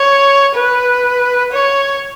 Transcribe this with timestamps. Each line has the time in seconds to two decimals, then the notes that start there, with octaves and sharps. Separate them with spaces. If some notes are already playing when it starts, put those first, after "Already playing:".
Already playing: C#5
0.54 B4
1.52 C#5